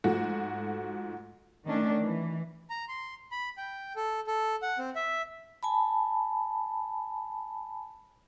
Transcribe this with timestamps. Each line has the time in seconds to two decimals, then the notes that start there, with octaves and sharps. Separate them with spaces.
0.04 G#2 F3 A3 F#4
1.64 D#3 A3 C#4 D4
2.02 E3
2.70 A#5
2.89 C6
3.31 B5
3.58 G5
3.96 A4
4.27 A4
4.63 F#5
4.79 C4
4.96 E5
5.63 G#5 A5 B5